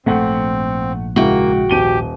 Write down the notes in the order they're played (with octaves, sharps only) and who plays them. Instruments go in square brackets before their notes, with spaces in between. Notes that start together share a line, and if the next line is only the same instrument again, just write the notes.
[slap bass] A#1 G#2 [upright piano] A3 F#5 [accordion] C4
[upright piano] C#2 E4 [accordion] A#3 [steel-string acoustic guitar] F#4 G5
[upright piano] D#1 D#7 G7 [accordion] G4